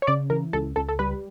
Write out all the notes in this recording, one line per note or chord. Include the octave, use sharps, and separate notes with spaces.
C#5
C#3 D5
E3 A#4
C#2 A4
C#2 A4
A4
G3 B4